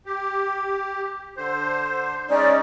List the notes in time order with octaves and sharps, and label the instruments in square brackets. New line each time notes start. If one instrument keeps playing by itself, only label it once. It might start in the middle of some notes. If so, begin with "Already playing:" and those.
[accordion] G4
D3 C5
[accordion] G#3 C#4 D#4 [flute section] D5